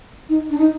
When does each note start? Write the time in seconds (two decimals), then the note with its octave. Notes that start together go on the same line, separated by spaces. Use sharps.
0.29 D#4
0.50 D4
0.58 D#4